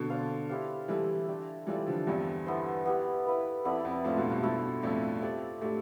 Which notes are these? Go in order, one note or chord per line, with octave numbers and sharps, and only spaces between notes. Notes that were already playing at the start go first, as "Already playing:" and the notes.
Already playing: B2 D3
D4 A4 C5 F5
E4 G4 C5 F5
E3 G3 A3 E4 G4
A3 D4 G4
E3 G3 D4 F4 A4 D5
D3 F3
E2 G2 G3 C4 E4 G4
B3 E4 A4 C5
B3 E4 G4
E4 B4 F5
F2 B3 E4 A4 D5
F2
F2 A2 A3 D4 F4 C5
G2 B2
G2 B2
G2 B2 A3 E4 A4 C5
F2 A2 D4 F4 A4 E5
A3 C4 G4 D5
A2 A3 D4 G4